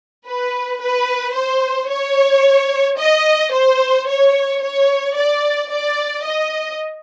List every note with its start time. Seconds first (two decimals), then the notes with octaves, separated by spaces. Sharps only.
0.26 B4
0.81 B4
1.35 C5
1.89 C#5
2.99 D#5
3.53 C5
4.07 C#5
4.62 C#5
5.16 D5
5.71 D5
6.25 D#5